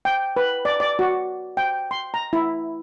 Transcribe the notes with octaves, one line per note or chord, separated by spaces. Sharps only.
G5
B4
D5
D5
F#4
G5
C6
A#5
E4